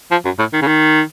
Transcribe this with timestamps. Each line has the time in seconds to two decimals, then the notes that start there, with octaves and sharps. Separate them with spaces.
0.11 F3
0.25 F#2
0.39 A2
0.53 D#3
0.62 C#3
0.67 D#3